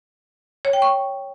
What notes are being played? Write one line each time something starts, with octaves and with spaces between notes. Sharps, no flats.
C#5
G5
C#6